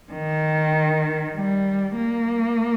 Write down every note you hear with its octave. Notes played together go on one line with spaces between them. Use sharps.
D#3
G3
A#3